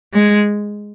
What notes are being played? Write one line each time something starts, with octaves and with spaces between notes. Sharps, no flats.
G#3